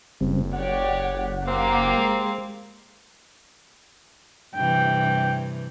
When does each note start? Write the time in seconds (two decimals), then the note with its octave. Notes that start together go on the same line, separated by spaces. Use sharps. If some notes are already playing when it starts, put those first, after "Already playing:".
0.21 F#1 C#3 G3 C4
0.53 G4 C#5 D5 F#5
1.48 A#3 C4 G4 F5
1.98 G#3
4.55 G2 C3 E3 G5